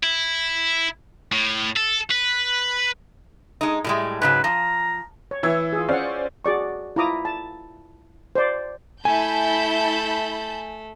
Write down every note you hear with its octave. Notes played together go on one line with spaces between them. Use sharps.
E4
A2
A4
B4
G#3 D#4
A2 G3 G#3
G#2 C#3 F#3 B4
F3 A#5
C#5
E3 E4 C#5 E6 G#6
F4 G#4
C#4 C5 D5 F5 F#5
F#4 G#4 D5 C#6
E4 F4 A#5 D6 D#6
A5
C5 D5
A3 E4 G#5 A5 B5 G6